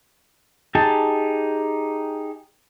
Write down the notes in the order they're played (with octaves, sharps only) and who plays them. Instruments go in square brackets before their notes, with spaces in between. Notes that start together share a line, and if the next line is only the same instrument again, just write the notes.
[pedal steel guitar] D#4 G4 G#4 A5